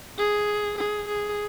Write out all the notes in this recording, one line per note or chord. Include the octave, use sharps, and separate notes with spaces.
G#4
G#4
G#4